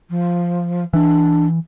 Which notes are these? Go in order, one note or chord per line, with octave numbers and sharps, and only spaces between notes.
F3
E3 D4